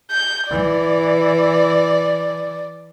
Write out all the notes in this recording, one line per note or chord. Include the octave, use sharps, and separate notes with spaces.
G6
E3 D5